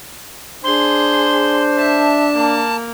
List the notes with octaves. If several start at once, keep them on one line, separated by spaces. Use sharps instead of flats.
D4 G#4 C5 C6
E5 A5
A#3